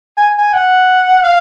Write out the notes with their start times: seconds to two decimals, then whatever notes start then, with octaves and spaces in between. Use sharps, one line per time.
0.17 G#5
0.38 G#5
0.53 F#5
1.24 F5